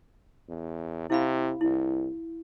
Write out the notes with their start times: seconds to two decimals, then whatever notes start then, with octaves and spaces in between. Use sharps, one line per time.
0.48 E2
1.10 C3 E4 F5 B5
1.61 C2 E4